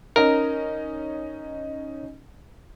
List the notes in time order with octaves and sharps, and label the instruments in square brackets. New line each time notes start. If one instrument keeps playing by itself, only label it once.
[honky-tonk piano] C#4 D#4 [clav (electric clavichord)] A#4